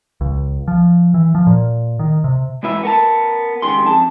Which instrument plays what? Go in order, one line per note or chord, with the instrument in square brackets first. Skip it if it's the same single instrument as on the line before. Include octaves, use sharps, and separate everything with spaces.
[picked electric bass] C#2
F3
E3
F3
A#2
D#3
C3
[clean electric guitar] E2 G#2 E3 B4 E5
B3 A#4 A5
C#2 D#3 G4 G#4 C6
F2 A5